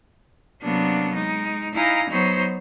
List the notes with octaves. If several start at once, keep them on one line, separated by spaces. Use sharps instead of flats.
C3 F#3 A#3 B3 D4
G#3 D#4
D#4 E4 D#5 F5 G#5 A#5
F#3 B3 D#4 C5 C#5